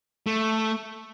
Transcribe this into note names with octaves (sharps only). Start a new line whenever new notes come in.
A3